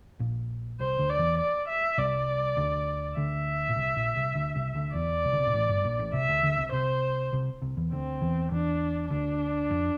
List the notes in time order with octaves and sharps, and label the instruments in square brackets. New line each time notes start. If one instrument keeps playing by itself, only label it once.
[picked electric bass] A#1 A#2
[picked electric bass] C2 C3 [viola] C5
[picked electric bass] D2 D3
[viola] D5
[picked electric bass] E2 E3
[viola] D5
E5
[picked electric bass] C2 C3 [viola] D5
[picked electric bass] D2 D3
[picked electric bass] D2 D3 [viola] E5
[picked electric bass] A#2
C2 C3
A#1 A#2
C2 C3
D2 D3
C2 C3
D2 D3
[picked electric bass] E2 E3 [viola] D5
[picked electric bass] C2 C3
D3
C3
A#2
A1 A2
G1 G2
A#1 A#2
A1 A2
[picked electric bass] C2 C3 [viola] E5
[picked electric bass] D2 D3
D2 D3
C2 C3
[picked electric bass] C2 C3 [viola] C5
[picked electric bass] C2 C3
C2 C3
E2 E3
[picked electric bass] D2 D3 [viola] C4
[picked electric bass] E2 E3
[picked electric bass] E2 E3 [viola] D4
[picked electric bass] D2 D3 [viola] D4
[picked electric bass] F2